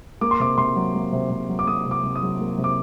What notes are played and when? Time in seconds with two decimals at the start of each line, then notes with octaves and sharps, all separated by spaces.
0.21 A#3 D6
0.31 C6
0.40 C3 D6
0.58 C3 C6
0.76 F#3
0.95 A#3
1.12 C3
1.30 C3
1.49 F#3
1.59 D6
1.67 A#3 D#6
1.86 C3
1.91 D6
2.03 C3
2.15 D#6
2.22 F#3
2.40 A#3
2.58 C3
2.64 D6